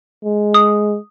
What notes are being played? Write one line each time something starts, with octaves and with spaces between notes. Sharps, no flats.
G#3
D#6